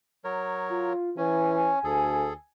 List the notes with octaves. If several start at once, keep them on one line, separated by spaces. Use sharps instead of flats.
F#3 A#4 C#5
F4
E3 C#4 G#5
D2 G#4 A4